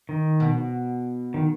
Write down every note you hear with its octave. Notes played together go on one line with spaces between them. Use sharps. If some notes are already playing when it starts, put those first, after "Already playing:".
D#3
B2
D#3